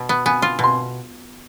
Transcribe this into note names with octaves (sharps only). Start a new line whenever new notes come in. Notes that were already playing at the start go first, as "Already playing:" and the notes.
Already playing: B2
B3
B3 G#5
F4
B2 C6